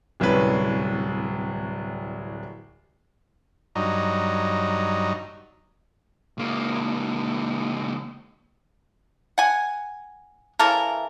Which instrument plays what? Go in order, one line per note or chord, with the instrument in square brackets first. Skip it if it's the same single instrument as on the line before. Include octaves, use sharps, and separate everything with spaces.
[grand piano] D1 C2 C#4 B4
[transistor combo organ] G2 F#3 D#4
[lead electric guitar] C#2 A#3
[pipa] F#5 G#5
C#3 E3 A4 A#4